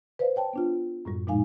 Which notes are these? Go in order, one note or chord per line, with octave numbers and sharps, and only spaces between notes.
B4 C5 D5 F5
C#5 G5 A5
B3 D4 F4
F#2 A2 G3
A#2 F3 G#3 D#4 F5 G#5